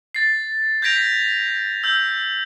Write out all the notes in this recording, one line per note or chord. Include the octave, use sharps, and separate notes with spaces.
A6 C7
G6 G#6 A#6 B6 D7 F7
E6 G6